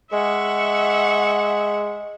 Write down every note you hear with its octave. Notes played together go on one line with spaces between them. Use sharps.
G#3 E5 F#5 C#6